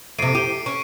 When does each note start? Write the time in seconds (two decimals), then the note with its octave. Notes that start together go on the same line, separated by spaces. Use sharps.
0.19 F2 C3 C7 D7 D#7
0.35 G4 D#7
0.66 C#4 C#6